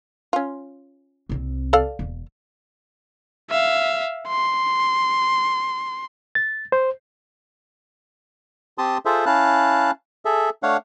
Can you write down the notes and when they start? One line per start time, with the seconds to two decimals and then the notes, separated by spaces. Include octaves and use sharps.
0.33 C#4 F4
1.29 C2 C4
1.73 A4 D5 F5
1.99 E1
3.50 E5 F5
4.28 C6
6.35 A6
6.72 C5
8.78 C4 G4 A5 C6 D#6
9.05 F4 G#4 A4 C5 E5
9.26 C#4 E4 F5 A5 F#6
10.25 G#4 A4 E5
10.63 A3 D4 C#5 F5 F#5